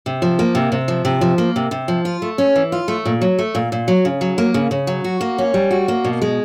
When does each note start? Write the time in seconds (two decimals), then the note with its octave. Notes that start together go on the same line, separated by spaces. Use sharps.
0.06 C3
0.22 F3
0.39 A#3
0.55 C3
0.72 C3
0.88 F3
1.05 C3
1.21 F3
1.38 A#3
1.56 C3
1.71 C3
1.88 F3
2.05 F4
2.22 A3
2.38 C#4
2.56 E3
2.72 F4
2.88 A3
3.05 A#2
3.21 F#3
3.39 A3
3.55 A#2
3.72 A#2
3.88 F#3
4.05 C#3
4.21 F#3
4.38 A#3
4.54 C#3
4.71 C#3
4.87 F#3
5.04 F#4
5.21 A#3
5.38 C#4
5.54 G3
5.71 F#4
5.88 A#3
6.04 B2
6.22 G#3